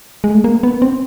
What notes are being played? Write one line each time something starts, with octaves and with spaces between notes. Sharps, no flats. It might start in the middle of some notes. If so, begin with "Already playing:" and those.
G#3
A3
A#3
B3
C4